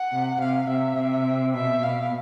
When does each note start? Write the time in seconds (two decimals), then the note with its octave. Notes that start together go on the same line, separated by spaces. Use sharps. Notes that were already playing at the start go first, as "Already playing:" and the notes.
Already playing: F#5
0.13 C3
0.40 C3 F5
0.69 C3 E5
0.97 C3
1.54 B2 E5
1.82 B2 F5